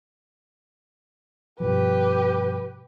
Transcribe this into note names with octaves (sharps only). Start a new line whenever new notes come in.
G2 B2 F3 G4 B4